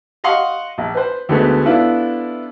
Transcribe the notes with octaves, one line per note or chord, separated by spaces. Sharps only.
D#5 F5 F#5 C6 C#6
A#1
B4 C5
D2 D3 G#3 A3 B3
B3 D4 E4 F4 A4